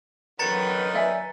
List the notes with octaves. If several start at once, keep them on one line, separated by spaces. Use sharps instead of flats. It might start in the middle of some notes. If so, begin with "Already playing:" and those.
F#2 D3 D#3 F#3 B4 A#5 A6 C#7
D5 E5 G#5